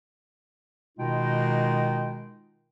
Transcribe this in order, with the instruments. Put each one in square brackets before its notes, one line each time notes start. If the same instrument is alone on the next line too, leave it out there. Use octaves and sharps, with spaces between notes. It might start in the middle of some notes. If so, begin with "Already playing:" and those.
[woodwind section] B2 D#3 G#3 D#4 F4 G5